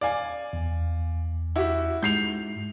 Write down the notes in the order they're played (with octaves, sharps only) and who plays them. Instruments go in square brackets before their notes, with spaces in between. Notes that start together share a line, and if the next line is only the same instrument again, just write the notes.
[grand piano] D5 F5 G#5
[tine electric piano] E2
[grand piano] E4 F#4 G4
[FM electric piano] G#2 [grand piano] G6 C7 F7